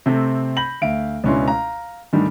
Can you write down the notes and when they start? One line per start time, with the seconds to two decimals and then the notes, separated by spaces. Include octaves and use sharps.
0.06 C3 A3 C4 A4
0.57 B5 G6 A#6 F#7
0.82 D2 E5 F5 D7
1.24 C#2 B2 C#4 D4 E4 C6
1.48 F5 A#5
2.13 G#2 D3 D#3 G3 A3